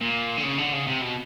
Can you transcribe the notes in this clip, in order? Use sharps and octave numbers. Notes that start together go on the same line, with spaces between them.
A#2
D3
C#3
D3
C#3
C3
B2